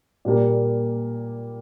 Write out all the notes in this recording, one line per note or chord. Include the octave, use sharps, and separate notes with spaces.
A#2 G3 A#3